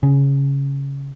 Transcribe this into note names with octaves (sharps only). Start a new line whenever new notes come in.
C#3